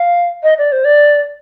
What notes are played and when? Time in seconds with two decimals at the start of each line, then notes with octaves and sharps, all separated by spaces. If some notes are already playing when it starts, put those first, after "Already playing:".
Already playing: F5
0.43 D#5
0.58 D5
0.72 C5
0.84 D5